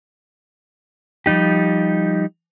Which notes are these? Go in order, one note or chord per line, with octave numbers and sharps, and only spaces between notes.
F3 G3 D#4 G4